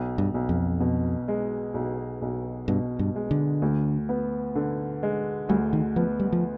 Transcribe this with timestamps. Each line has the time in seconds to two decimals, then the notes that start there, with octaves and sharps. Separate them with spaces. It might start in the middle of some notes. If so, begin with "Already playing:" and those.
Already playing: B1
0.18 G2
0.34 B1
0.49 F2
0.80 B2
1.28 G#3
1.74 B1
2.22 B1
2.68 G2 B2
2.99 G2
3.15 G#3
3.31 D3
3.62 D2
4.09 B3
4.55 D3
5.03 G#3
5.49 D2 G3
5.73 D#3
5.96 F3 B3
6.20 G3
6.33 F3